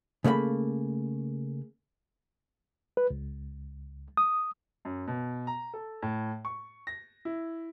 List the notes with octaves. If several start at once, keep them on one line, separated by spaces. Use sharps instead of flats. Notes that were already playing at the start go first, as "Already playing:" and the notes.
C#3 A3 A#3 D#5 B5
B4
C#2
D#6
F#2
B2
A#5
A4
A2
C#6
A#6
E4